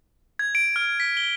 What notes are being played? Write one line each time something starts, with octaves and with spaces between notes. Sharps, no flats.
G#6
D7
F6
B6
G7